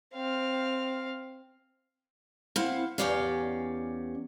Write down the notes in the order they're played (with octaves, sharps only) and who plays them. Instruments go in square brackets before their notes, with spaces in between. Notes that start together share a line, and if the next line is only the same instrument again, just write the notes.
[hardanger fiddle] C4 F5
[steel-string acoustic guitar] C4 E4 F5 F#5
E2 G2 C#4 G4 D5 F5